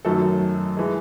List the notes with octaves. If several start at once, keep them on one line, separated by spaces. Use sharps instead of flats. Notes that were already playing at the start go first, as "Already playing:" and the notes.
F#2 D#3 F#3 A3 A4
E3 G#3